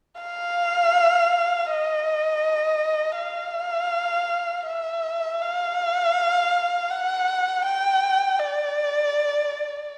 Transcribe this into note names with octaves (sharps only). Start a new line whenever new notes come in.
F5
D#5
F5
E5
F5
F#5
G5
D5